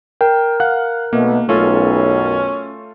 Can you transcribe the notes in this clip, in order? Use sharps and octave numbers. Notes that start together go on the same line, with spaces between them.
A#4 G5
F5 F#5 F#6
B1 B2 A3 A#3
B1 F#2 A3 C#4 F4 A4